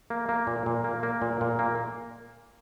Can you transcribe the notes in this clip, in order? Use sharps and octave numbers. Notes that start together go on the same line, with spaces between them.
A#3
A#3
A#2
A#2
A#3
A#3
A#2
A#2
A#3